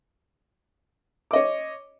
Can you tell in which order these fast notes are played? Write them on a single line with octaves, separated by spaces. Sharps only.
D6 D#5 C#5